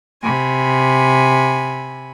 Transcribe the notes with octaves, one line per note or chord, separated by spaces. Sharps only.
C3 G#5 B5